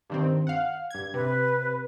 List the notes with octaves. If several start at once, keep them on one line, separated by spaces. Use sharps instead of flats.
G2 D#3 C4
F5 F#5
G2 G#6
C3 B4